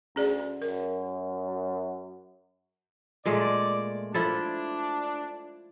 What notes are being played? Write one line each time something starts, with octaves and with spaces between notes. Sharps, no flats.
D2 C#4 G#4 D5
F#2 A#4
A#2 G#3 A3 D5
F3 D4 E4 A4